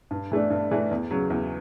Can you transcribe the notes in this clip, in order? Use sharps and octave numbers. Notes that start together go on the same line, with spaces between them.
G2
E3 A3 D4
G2
E3 A3 D4
E2
C#3 F#3
E2